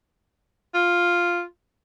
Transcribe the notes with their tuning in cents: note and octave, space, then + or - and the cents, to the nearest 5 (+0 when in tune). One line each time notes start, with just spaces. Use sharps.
F4 +0